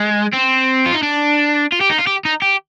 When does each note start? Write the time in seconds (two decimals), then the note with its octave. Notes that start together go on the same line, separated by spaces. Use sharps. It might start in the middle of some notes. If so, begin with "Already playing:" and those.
Already playing: G#3
0.33 C4
0.86 F4
0.94 D#4
1.03 D4
1.72 F4
1.81 G4
1.90 D#4
1.98 F4
2.07 G4
2.25 D#4
2.42 G4